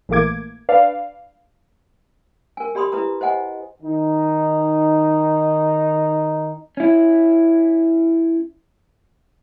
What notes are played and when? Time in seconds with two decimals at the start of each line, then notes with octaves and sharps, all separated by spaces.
0.09 A#1 E3 A3 A#3 D6 G#6
0.69 D4 B4 D5 F5
2.57 A#4 G#5
2.75 G4 D5 B5 C6 D#6
2.92 E4 B4 D5 A#5 D#6
3.21 C5 D#5 F#5 G#5
3.83 D#3 D#4
6.77 C#4 E4